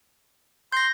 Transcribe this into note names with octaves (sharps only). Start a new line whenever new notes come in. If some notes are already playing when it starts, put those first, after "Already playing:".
C6 G6 A#6